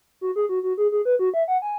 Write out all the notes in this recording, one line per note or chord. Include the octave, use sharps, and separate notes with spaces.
F#4
G#4
F#4
F#4
G#4
G#4
B4
F#4
E5
F#5
G#5